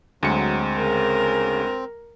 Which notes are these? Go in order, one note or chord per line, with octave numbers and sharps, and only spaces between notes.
D2 F#3 G#3 C4 C#7
C#3 A#4